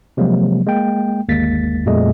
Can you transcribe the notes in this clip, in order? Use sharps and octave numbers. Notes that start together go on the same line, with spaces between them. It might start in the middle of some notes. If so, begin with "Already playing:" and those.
C3 F3 F#3 G#3 A#3
G#3 A#3 G5
G1 D#2 G#3 A#3 A6 B6
F2 A#2 G3 A3 G#4 D#5